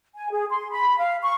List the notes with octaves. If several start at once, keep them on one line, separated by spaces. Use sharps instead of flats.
G#5
G#4
C6
B5
F5
C#6